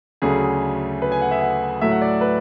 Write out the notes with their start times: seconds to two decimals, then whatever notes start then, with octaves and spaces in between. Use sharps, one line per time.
0.22 D2 C#3 F#3 A3 G#4
1.02 B4
1.12 G#5
1.22 F#5
1.31 E5
1.41 F#5
1.81 A2 F#3 A3 E5
1.91 F#5
2.02 D5
2.21 B4